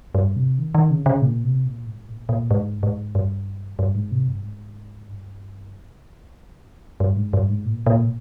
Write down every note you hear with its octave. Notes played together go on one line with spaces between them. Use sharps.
G2
C3
D#3
D#3
C#3
C#3
A#2
C3
A#2
G#2
A#2
A#2
G#2
G#2
G2
G2
G#2
C3
G2
G#2
G2
G2
G#2
G2
G#2
A#2
A#2